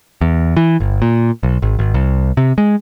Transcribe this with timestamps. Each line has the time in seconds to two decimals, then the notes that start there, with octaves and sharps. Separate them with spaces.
0.21 E2
0.57 E3
0.80 G1
1.02 A#2
1.43 B1
1.62 G#1
1.79 G#1
1.94 C2
2.37 C3
2.58 G#3